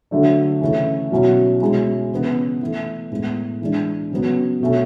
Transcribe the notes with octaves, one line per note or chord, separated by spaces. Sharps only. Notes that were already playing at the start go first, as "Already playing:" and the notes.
D3 F#3 A3 D4
C#3 E3 A3 E4
B2 F#3 C#4 E4
B2 G#3 C#4 E4
C#3 E3 B3
E3 A3 E4
A2 G#3 B3 E4
E3 G#3 D4
C#3 F#3 B3
B2 A3 C#4